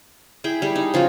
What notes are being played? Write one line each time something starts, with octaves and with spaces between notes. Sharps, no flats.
E4 G#4 G5
G3 G#4
D#4
C#3 F3 F4 F#4